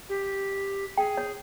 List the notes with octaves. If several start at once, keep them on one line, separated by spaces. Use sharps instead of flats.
G4
G#4 G5
C#5